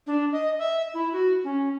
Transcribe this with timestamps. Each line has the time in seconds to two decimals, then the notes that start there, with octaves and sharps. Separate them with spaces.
0.07 D4
0.32 D#5
0.59 E5
0.94 E4
1.13 F#4
1.44 C#4